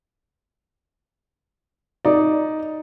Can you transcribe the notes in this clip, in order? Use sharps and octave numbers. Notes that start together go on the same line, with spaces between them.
D#4 D5